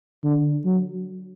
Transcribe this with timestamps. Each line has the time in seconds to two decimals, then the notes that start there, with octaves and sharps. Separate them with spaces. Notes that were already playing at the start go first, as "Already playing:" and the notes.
0.24 D3
0.65 F#3